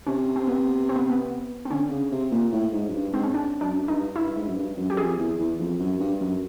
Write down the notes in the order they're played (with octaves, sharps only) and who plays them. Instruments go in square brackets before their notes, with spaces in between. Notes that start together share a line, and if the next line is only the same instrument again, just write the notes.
[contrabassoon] C3 [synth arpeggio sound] C#4
[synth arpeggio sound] C4
B3
C4
B3
B3
C4
[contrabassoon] D3 [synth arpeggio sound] C#4
[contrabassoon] C#3
C3
A#2
A2
G#2
F#2
G2
[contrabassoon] G#2 [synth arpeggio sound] C4
[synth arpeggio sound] C#4
D4
[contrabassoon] F#2 [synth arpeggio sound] D4
[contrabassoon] G2 [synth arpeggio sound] D#4
[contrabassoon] G2 [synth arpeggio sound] E4
[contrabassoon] G#2
F#2
G2
F#2
[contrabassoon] F#2 [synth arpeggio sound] G4
[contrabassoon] F2 [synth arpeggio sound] G#4
[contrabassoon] E2
E2
F2
F#2
G2
F#2